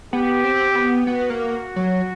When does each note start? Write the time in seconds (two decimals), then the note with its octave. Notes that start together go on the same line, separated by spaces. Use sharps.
0.13 B3 G4
0.44 C4
0.75 B3
1.07 B3 F#4
1.30 A#3
1.76 F#3